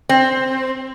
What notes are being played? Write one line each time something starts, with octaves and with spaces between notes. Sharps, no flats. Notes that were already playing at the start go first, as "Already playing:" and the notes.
C4